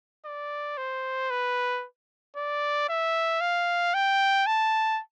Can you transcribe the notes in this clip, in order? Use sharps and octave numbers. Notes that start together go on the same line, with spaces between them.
D5
C5
B4
D5
E5
F5
G5
A5